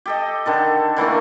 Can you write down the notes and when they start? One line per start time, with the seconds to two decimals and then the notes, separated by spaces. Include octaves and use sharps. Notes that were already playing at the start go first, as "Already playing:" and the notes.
0.06 G4 A4 D#5
0.46 D3 D#3 A4
0.97 D3 E3 A3 A#3